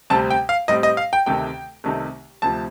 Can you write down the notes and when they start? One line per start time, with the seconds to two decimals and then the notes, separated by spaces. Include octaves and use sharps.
0.10 D2 C3 G3 C4 A5
0.31 G5
0.49 F5
0.68 A2 G3 C4 D#5
0.83 D#5
0.97 F5
1.13 G5
1.26 D2 C3 D#3 A3 G5
1.84 C2 C3 D#3 A3 D#4
2.42 D2 C3 F3 A5